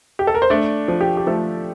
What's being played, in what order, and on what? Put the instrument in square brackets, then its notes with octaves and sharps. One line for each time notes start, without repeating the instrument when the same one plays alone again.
[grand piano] G4
A4
A#4
C5
A3 D4 D5
F3
G4
G4
F3 A3 A4